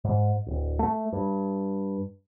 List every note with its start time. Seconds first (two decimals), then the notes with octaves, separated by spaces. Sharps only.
0.04 G#2
0.46 D1
0.79 A3
1.13 G2